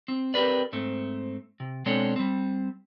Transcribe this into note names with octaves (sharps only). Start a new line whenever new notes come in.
C4
C4 G4 A#4 B4 D5
G#2 A3 C4
C3
B2 G#3 C4 D4 A4 C#5
G3 C4